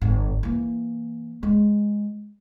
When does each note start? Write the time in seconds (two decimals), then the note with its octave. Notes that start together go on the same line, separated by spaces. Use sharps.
0.02 G1
0.43 E3 A#3
1.43 G#3